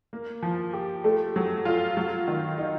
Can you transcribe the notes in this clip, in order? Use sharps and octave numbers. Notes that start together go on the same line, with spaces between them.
A#3
F3
G4
A3
F#3
F4
F#3
D#3
D#4